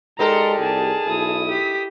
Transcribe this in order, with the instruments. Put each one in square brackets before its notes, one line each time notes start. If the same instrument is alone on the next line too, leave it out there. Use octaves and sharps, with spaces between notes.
[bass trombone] G#3 [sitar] D#4 A4 A#4 [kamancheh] G4 D5 [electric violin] A#5 C6
[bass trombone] C2 [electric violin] G#4 A5
[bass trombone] B1 [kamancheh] E4 D#6
[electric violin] G4 B6